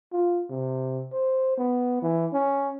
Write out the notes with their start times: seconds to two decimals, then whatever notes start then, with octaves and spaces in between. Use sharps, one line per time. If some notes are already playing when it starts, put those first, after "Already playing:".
0.13 F4
0.50 C3
1.13 C5
1.57 B3
2.02 E3
2.33 C#4